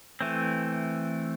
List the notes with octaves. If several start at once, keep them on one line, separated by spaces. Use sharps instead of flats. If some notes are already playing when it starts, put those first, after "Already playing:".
E3 A3 C4